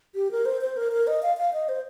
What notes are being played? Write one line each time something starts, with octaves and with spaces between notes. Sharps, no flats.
G4
A#4
C5
C5
A#4
A#4
D#5
F5
F5
D#5
C5